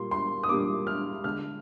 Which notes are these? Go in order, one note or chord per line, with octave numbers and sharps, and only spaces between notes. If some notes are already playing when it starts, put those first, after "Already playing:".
Already playing: A#2 G3 A#3 C6
C6
D#6
A#2 G3 A#3 D6
F6
D3 G#3 F6